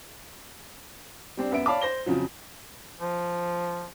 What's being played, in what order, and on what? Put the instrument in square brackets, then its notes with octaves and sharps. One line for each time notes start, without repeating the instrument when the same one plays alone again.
[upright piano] G3 C4 D4
F#2 B3 E5 D7
C#5 D5 F5 A5 B5 D6
C5 A#6 G7
F2 C#3 F3 F#3
[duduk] F3